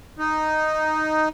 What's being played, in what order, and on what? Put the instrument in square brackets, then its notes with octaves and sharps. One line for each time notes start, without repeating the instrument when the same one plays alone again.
[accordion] D#4